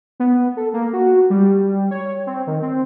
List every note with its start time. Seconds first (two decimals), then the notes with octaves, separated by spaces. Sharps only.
0.20 B3
0.57 A4
0.73 A#3
0.93 F#4
1.30 G3
1.91 C#5
2.27 C4
2.47 D#3
2.62 C4